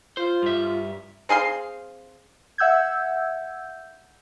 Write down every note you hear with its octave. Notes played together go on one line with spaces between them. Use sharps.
F4 C5
G2 E5
C4 G#4 F5 C6
E5 F#5 E6 G6 G#6